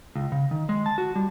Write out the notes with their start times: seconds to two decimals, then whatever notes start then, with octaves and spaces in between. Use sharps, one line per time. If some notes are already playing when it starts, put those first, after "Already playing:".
0.15 C#2
0.32 C#3
0.51 D#3
0.69 G#3
0.86 A5
0.98 F#4
1.15 G3